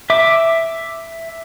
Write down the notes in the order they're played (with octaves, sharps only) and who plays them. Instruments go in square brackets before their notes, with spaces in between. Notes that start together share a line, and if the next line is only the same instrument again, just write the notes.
[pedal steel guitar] E5 D6